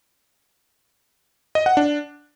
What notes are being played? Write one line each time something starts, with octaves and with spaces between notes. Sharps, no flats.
D#5
F#5
D4